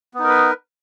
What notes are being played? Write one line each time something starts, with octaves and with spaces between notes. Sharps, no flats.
B3 D#4 A#4 B4